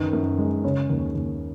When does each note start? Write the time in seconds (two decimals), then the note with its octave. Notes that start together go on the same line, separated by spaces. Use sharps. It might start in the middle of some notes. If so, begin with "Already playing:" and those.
Already playing: F#2 D#3 B4
0.13 F#2
0.38 G#3
0.64 C#3 C#5
0.89 D#2
1.15 D#2